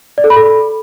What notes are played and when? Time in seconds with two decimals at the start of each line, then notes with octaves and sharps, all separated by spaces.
0.18 D5
0.24 A4
0.30 B5
0.36 A4